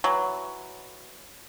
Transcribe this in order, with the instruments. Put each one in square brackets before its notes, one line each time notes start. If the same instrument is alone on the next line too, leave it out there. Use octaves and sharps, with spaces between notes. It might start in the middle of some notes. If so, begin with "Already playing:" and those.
[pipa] E3 F#3